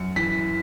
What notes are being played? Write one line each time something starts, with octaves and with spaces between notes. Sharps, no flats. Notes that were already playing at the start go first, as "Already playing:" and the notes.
Already playing: F#2 C#7
E3 B6